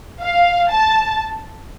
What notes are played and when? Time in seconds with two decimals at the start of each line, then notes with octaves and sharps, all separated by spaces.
0.20 F5
0.71 A5